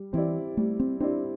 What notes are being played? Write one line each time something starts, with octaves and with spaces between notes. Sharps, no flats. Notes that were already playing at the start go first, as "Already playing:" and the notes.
Already playing: G3
E3 C4 E4 G4 D5
G3 A3
C4
C4 D4 E4 G4 D5